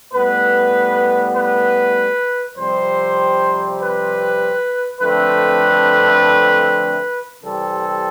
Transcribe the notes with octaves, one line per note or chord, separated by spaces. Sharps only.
A2 G3 B3 B4
B4
F2 C3 G3 C4 C5
B4
F2 D3 A3 C4 B4
C3 E3 G3 C4 A4